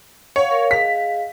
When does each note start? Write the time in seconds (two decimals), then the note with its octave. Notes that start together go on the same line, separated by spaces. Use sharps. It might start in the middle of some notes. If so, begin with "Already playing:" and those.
0.36 C#5 F5 F#5
0.50 A#4 F5
0.71 G#4 D#5 F5 B6